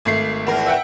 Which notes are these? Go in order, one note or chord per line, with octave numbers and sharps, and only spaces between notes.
G#1 A3 C7
E2 A#4
E5 F#5 G5